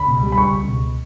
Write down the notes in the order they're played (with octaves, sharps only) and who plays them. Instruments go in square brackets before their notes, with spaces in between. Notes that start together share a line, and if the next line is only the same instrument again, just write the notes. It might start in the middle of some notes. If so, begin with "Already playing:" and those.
Already playing: [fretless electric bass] C#2 [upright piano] B5
[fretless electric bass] B2
G3
[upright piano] B5
[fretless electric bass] C#2 [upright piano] C#6
[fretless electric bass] C#2
B2